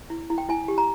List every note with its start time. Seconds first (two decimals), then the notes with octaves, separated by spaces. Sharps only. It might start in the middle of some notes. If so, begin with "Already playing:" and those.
0.10 E4
0.30 E4
0.38 G5
0.49 E4 G#5
0.68 G4
0.78 A#5